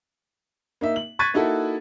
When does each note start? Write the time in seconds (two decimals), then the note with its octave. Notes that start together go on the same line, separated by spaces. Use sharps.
0.81 A#3 D#4 E5
0.96 F#7
1.19 C#6 F#6 G#6 A6 B6 D#7
1.34 A#3 D#4 E4 F#4 A4